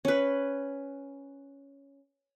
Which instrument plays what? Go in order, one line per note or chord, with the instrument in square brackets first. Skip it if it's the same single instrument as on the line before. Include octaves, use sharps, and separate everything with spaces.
[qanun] C#4 B4